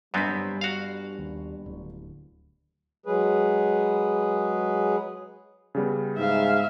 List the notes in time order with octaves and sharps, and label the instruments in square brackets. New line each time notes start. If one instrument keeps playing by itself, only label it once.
[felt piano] G1 G#5 B6 [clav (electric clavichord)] F#2 B3 C4 [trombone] G3
[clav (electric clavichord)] F#4 F5
[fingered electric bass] D#2
D1
[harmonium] F#3 G#3 G#4 B4
[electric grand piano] C#3 G3 B3
[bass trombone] G#2 [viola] E5 F5